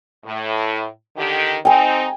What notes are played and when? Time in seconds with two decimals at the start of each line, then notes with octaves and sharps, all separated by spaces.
0.24 A2
1.16 D3 D#3 G4
1.65 C4 D#4 G5 G#5